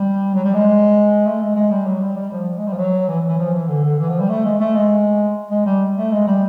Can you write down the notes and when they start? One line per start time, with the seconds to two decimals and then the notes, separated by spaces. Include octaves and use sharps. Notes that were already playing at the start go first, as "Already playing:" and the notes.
Already playing: G3
0.34 F#3
0.44 G3
0.54 G#3
1.26 A3
1.41 G#3
1.56 G#3
1.71 G3
1.86 F#3
2.02 G3
2.17 G3
2.32 F3
2.57 G#3
2.67 G3
2.73 F3
2.78 F#3
3.08 E3
3.28 E3
3.39 F3
3.53 E3
3.68 D3
3.83 D3
3.99 E3
4.10 F3
4.20 G3
4.29 A3
4.45 G#3
4.60 A3
4.75 G#3
5.51 G#3
5.66 G3
5.97 A3
6.12 G#3
6.27 G3